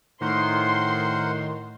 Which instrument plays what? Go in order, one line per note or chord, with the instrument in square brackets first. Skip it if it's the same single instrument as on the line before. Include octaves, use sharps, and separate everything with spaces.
[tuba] A2 [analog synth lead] D#3 [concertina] A#4 C5 F#5 [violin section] C6